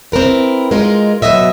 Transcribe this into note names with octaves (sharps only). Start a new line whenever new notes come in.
C4 E4 A#4 B4
G#3 D#4 F4 A#4
B2 E3 F#3 D#5 E5